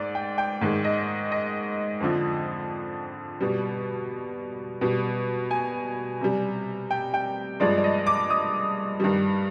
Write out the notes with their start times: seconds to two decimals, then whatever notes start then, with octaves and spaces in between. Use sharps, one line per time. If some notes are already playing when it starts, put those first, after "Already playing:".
Already playing: G#2 D5
0.15 G5
0.38 G5
0.61 G#2 D#3 G#3
0.84 D#5
1.32 D#5
2.00 F2 D3 F3
3.41 B2 G3
4.81 B2 G3
5.51 G#5
6.21 C3 G3
6.91 G5
7.14 G5
7.60 G2 F3 G#3 D5
7.78 D5
7.84 D#5
8.07 D6
8.30 D#6
9.00 G2 D#3 G3